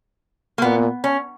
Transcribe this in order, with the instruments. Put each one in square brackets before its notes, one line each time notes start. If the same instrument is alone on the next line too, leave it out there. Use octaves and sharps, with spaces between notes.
[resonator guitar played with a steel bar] A#3
[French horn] A#2 [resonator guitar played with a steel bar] B3
[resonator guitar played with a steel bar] C#4